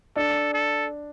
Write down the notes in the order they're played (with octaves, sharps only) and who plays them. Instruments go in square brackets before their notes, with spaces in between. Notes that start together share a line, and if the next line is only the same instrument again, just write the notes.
[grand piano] D4 [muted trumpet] A4
[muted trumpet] A4